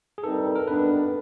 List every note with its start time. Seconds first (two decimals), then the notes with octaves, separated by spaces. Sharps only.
0.18 G#4
0.23 G2 D#3 G3 C4 D#4 A4
0.56 A#4
0.67 G2 D#3 G3 B3 D4 B4